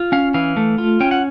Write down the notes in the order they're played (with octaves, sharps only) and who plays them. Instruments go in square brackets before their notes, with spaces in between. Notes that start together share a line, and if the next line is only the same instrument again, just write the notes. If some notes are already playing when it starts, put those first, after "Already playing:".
Already playing: [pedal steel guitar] F4
C#4 F5
E3 F5
A3
F4
C#4 G5
F#5